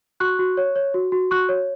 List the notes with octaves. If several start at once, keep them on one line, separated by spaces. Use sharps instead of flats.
F#4 C#6 F#6
F#4
C#5
C#5
F#4
F#4
F#4 C#6 F#6
C#5